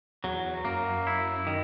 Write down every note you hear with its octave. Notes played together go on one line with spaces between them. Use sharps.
E2 F#3
F#2 A#3
E4
D#3